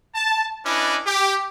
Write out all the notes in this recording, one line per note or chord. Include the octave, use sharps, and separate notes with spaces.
A5
C#4 D4 E4 B4 D5 D#5
G4